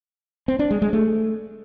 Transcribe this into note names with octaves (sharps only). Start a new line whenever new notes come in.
C4
D4
G#3
G#3
A3